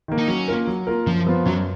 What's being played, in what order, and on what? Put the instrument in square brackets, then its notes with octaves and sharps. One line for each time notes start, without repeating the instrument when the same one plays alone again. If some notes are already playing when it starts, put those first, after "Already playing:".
[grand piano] D#3 A#3
[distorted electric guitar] D#4
[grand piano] F#3 [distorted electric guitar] C#4
[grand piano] A#3 F4 A#4
F#3
A#3 F4 A#4
[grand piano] F#2 [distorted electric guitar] F3
[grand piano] F3 B3 F4
[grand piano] F#2 [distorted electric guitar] F#3